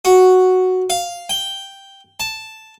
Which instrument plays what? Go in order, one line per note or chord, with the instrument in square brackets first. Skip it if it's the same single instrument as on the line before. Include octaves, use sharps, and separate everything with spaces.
[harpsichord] F#4
F5
G5
A5